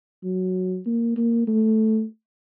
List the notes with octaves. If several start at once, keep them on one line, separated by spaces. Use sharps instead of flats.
F#3
A#3
A#3
A3